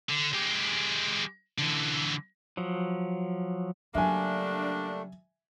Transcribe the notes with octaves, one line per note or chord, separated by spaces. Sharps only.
D3
G#3 G4
D3 E3
F3 F#3
C#3 F#3 G3 A3 A#3 D4 E5 G#5